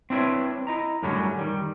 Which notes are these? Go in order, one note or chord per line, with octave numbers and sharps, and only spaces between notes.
C4 D4 E4 B4 C#5
E4 D#5 A#5
F#2 A2 D3 F#3 G3 C#4
D#3 G3